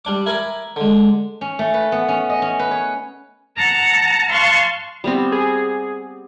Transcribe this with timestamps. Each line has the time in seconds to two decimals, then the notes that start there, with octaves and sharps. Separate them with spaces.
0.05 G3 D4 D6
0.26 E4 A#4 G#5 B5 D6
0.76 D3 G#3
1.41 C#4
1.59 A3
1.74 B4
1.92 B3
2.08 C#4
2.29 D#5
2.42 C#4
2.59 B4
2.71 C#5
3.56 F#5 A5 A#5
4.29 F5 A5 C6 C#6 F#6
5.04 G3 B3 C4
5.32 G#4